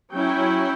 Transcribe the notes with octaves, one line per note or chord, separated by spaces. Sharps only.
F#3 C#4 E4 G5